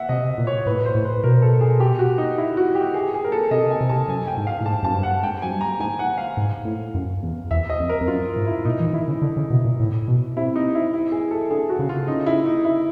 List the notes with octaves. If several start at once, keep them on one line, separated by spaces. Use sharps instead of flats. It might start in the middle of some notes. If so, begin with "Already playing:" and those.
Already playing: E5 F#5
C3 D#5
A#2
C#5
A2 B4
C5
A2
B4
B2 A#4
A4
G#4
G4
F#4
D#4
E4
F#4
G4
G#4
G#4
A#4
A4
C3 D#5
G#5
C3
A5
F#2 G#5
G5
G#2
F5
A2
G#2 A5
F#2 A5
G2
F#5
G#2 G5
F#2 G#5
G2
A#5
G#2 G#5
F#5
F5
G#2
A2
F#2
E2
E2 E5
D#5
F2
A#4
F2
F#2 F4
G#2
E4
A#2 D#4
E3
D#3 E4
C#3
D3
C#3
B2
A#2
A2
B2
C3 E4
D#4
E4
E4
G#4
A4
D3 G#4
F#4
C#3
F4
C#3 D#4
E4
D#4
E4